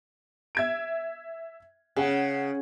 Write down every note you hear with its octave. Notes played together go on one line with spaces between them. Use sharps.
E5 G#6 D7
C#3 G#4 F#5